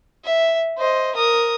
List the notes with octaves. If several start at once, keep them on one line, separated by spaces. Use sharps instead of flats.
E5
C5 D#5
A#4 D#6